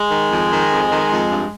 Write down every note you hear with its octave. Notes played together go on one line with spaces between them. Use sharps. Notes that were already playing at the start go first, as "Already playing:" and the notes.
Already playing: G#3
D#3
F2
D#3
F2
D#3
F2
G2